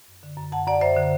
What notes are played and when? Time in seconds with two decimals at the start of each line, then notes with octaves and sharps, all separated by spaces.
0.08 F#2
0.23 D3
0.37 F#2
0.52 F#2 F#5 A5
0.67 F#2 D5 F#5
0.81 F#2 C5 E5
0.97 D3